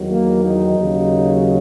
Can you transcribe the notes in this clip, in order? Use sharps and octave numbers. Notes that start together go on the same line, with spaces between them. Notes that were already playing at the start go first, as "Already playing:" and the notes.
Already playing: E2 D#3 F#3
A#3
D#4
D#2 C#3 F#3